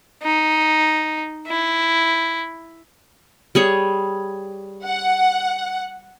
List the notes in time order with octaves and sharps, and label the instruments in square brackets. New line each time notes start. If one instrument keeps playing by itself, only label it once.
[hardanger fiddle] D#4
E4
[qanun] G3 G#4 C#5
[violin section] F#5